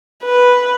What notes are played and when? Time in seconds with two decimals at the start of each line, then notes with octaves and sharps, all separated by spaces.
0.24 B4